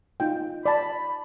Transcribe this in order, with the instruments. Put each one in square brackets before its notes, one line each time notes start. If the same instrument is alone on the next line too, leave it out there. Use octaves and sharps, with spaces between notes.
[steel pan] D#4 F4 G5
[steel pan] D5 A5 [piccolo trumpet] B5